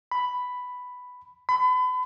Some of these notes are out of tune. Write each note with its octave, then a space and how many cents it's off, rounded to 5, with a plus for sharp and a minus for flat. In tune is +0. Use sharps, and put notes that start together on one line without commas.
B5 +5
B5 +35